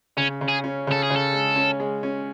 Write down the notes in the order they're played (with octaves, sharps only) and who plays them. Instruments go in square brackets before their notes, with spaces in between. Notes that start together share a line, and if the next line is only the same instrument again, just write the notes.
[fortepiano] C#3 [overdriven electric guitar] C#4
[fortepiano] C#3
[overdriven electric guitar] G#4
[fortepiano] C#4
[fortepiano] C#3 [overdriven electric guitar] A4
[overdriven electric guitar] G#4
[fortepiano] C#3
[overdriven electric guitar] A4
[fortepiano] G#3
C#4
G#3
C#4